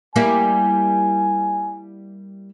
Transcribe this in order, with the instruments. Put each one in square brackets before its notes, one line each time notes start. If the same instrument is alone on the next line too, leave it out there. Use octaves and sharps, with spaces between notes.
[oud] G3 A#3 E4 [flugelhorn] G#5